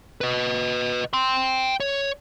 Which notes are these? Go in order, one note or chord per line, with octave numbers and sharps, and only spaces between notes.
B4 D#5
G5 C6
C#5